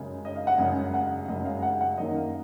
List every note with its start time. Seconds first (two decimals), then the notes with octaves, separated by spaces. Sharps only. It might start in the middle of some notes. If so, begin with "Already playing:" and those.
Already playing: F#2 C#3 G#3
0.25 D#5
0.36 F5
0.47 F#5
0.58 F#2 C#3 G#3 G#5
0.94 F#5
1.28 F#2 C#3 G#3 D#5
1.45 F5
1.62 F#5
1.81 F#5
1.98 F#2 D#3 A#3 D#5
2.16 F5